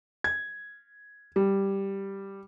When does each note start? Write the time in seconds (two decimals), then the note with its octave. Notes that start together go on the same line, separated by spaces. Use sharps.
0.24 G#6
1.36 G3